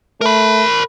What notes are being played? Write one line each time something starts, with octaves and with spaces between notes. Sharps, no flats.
A3 A#4 B5